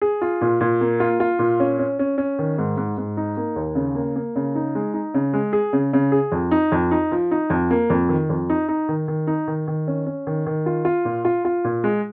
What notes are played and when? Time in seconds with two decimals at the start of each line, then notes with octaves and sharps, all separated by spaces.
0.02 G#4
0.22 F4
0.41 A#2
0.61 A#2
0.81 A#3
1.00 F4
1.20 F4
1.39 A#2
1.60 C#4
1.79 C#4
1.99 C#4
2.18 C#4
2.39 D#3
2.58 G#2
2.77 G#2
2.98 G#2
3.17 D#4
3.37 A#3
3.56 D#2
3.75 C#3
3.95 A#3
4.16 A#3
4.36 C#3
4.55 D#4
4.75 G#3
4.94 D#4
5.14 C#3
5.33 G#3
5.53 G#4
5.73 C#3
5.93 C#3
6.12 G#4
6.32 F2
6.51 D#4
6.72 F2
6.91 D#4
7.12 F3
7.31 D#4
7.50 F2
7.71 A#3
7.90 F2
8.09 D#3
8.30 F2
8.50 D#4
8.69 D#4
8.89 D#3
9.08 D#3
9.27 D#4
9.48 D#3
9.68 D#3
9.87 C#4
10.06 C#4
10.27 D#3
10.47 D#3
10.66 F4
10.85 F4
11.05 A#2
11.25 F4
11.45 F4
11.64 A#2
11.84 G#3